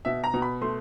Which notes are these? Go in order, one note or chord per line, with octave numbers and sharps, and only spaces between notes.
B2 E5
A#5
B2
B5
A3 C6